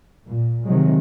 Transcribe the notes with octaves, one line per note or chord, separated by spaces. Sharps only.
A#2
C3 D#3 F3 F#3 G#3